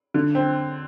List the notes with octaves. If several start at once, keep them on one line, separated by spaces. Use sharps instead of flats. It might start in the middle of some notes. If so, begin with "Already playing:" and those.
D3
C4